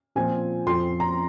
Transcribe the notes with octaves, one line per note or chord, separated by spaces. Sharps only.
A#2 F3 C4 F4 G#5
F2 F3 C4 C6
A#5